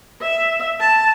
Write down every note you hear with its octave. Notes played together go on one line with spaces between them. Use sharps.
E5
A5